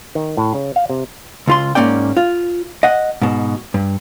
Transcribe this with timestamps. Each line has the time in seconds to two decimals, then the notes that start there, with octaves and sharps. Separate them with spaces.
0.15 D#3
0.37 A2
0.55 C#3
0.76 F5
0.90 C3
1.47 C#2 F4 C6
1.75 G#2 C3 A#3 C#4 D5 G5
2.17 F4
2.83 D#5 F#5
3.22 G#2 B2
3.74 G2